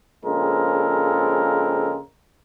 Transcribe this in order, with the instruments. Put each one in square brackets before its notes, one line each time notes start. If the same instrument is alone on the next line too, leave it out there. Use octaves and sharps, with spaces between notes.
[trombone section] A#1 C#3 G#3 C4 A4 A#4